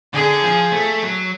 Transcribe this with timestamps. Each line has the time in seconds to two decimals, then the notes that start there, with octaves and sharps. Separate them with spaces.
0.14 D3 G#4
0.42 F3
0.72 A3
1.02 F#3